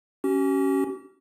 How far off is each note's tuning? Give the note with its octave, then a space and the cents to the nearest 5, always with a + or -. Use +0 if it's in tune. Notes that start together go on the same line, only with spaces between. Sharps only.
C#4 +0 G4 -45